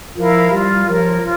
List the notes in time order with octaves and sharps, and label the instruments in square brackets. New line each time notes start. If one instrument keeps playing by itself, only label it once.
[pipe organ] F3 [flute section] E4 A#4 F5
[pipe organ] G3 [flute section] F4
[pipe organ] F3 [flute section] A#4 C#5
[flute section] F4